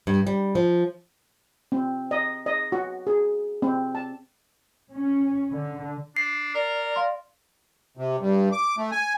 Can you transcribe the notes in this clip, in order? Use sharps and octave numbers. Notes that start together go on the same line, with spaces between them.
G2
G3
F3
C4
D#5
D#5
F#4
G#4
C4
A5
C#4
D3
D4 C7
A#4 D5
F5 C6
C3
G2
D6
A3
G#5